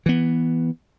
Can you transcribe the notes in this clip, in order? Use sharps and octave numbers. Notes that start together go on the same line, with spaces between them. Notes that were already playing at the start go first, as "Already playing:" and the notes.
E3 B3